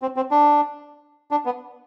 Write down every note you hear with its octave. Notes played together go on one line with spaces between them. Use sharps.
C4
C4
D4
D4
B3